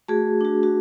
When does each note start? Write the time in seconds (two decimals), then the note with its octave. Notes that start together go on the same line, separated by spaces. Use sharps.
0.08 A3 F#4 G#4
0.41 D4 F#4
0.63 F#4